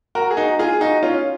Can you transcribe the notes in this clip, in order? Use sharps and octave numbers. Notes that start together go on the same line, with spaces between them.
F#4 A#4
G#4
D#4 F#4
F4 G#4
D#4 F#4
C#4 F4